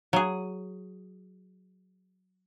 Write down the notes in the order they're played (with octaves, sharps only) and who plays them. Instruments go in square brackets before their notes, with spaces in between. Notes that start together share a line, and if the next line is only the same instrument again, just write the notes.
[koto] F#3 G#4